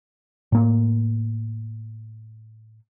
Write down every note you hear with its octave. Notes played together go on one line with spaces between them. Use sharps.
A2 A#3